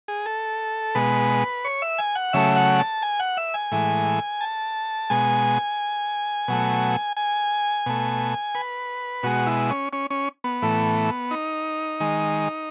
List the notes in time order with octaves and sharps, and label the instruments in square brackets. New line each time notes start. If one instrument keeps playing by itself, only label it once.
[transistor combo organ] G#4
A4
B2 G#3 B4
C#5
E5
G#5
F#5
C#3 F#3 A3 E5
F#5
A5
G#5
F#5
E5
G#5
A2 E3 G#3
A5
B2 G#3 G#5
B2 F#3 A3
G#5
B2 A3
B4
B2 G#3 F#4
E4
C#4
C#4
C#4
B3
A2 E3 A3
D#4
D#3 G#3